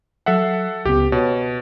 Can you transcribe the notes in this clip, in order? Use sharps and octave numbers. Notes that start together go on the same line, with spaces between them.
F#3 A4 E5 F#5 C7
C#2 C#3 B3 G4
B2 C#5